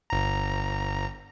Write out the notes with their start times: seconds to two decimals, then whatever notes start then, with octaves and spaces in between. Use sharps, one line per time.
0.10 G1 A#5